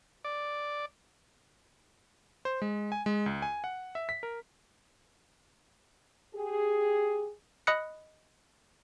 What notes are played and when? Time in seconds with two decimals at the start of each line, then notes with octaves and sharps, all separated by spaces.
0.25 D5
2.45 C5
2.62 G#3
2.92 G#5
3.06 G#3
3.26 C#2
3.42 G#5
3.64 F#5
3.95 E5
4.09 B6
4.23 A#4
6.35 G4 G#4
7.67 D#5 B5 D#6 F#6 C#7